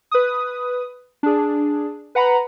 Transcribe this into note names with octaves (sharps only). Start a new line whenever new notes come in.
B4 D#6
D4 G#4
B4 F#5 A#5 B5